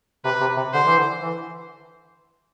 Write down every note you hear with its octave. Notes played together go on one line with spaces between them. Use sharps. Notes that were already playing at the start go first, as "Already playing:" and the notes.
C3 B4
C3
C3
D3 C5
E3
D3
E3